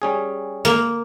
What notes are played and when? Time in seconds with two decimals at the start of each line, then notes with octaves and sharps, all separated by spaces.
0.02 G3 C#4 G#4
0.65 A#3